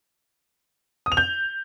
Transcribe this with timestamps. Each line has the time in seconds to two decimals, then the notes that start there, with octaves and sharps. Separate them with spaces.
1.06 D#6
1.12 F7
1.17 G6